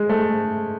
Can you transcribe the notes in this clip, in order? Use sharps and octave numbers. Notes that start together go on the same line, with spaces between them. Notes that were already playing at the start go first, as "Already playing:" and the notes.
Already playing: G#3
A3